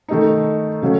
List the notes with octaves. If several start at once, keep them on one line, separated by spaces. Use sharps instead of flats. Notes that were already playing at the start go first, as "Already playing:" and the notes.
D#3 A3 D#4
C#3 F#3 A3 C#4